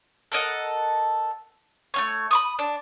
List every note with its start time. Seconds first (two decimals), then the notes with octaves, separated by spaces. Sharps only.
0.32 A4 A#4 D#5 F#5
1.94 A3 C#4 C#5
2.31 B5 C#6 D#6
2.59 D4